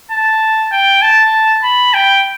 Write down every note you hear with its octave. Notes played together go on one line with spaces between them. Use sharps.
A5
G5
A5
B5
G5